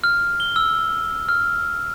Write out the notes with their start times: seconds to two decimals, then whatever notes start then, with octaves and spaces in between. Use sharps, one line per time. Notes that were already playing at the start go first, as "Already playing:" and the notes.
0.04 F6
0.40 G7
0.56 E6
1.29 F6